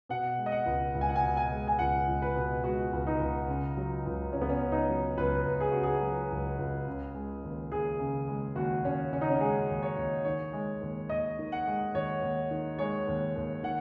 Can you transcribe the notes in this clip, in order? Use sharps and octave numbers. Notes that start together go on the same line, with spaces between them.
B2 F#5
G#3
D#5
F#5
C#2
C#2
G#5
F#5
G#5
B2
G#5
G#3
G#5
C#2 F#5
C#2
B4
B2
G#3 F#4
C#2
D#4
C#2
C#3
F#3
C#2
C#2 C#4
B3
C#4
C#3
D#4
C#4
F#3
C#2 B4
C#2
G#4
C#3 F#4
G#4
F#3
C#2
C#2
C#3
G#3
D#2
D#2 G#4
C#3
G#3
D#2 F#4
D#2 C#4
C#3 C#4
D#4
C#4
G#3 G#4
D#2
C#5
D#2
D#3 C#5
G#3
D#2
D#2 D#5
D#3
F#5
G#3
D#2 C#5
D#2
D#3
G#3 C#5
D#2
D#2
D#3 F#5